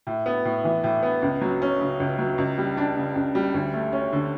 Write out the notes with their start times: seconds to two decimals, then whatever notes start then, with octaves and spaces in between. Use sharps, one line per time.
0.07 A2
0.26 B3
0.45 A2
0.64 E3
0.84 A2
1.03 B3
1.22 C#2
1.41 F#3
1.62 C#4
1.81 C#3
2.00 C#2
2.19 F#3
2.38 C#2
2.58 G3
2.77 D4
2.97 C#3
3.16 C#2
3.35 G3
3.54 D2
3.73 A3
3.93 C#4
4.13 D3